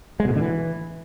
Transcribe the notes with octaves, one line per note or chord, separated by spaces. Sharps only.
G#3
B2
A2
D3
E3